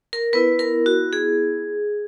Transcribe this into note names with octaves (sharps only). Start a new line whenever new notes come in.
A#4
B3 E4 B4
A#4
F#4
G#4